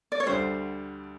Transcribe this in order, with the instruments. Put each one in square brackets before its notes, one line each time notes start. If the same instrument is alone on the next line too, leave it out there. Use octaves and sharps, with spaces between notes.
[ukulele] D5
C#5
[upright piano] D2 D3 G3 [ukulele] C5